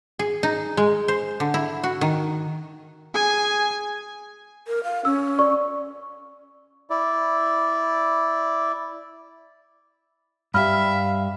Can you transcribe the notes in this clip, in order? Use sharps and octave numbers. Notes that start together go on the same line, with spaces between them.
G#4
D#4
G#3
C5
D3
E4
F#4
D#3
G#4 G#5
A#4
F5
C#4 E6
D5 C#6
E4 D5
G2 G4 E5 F5 B5 F6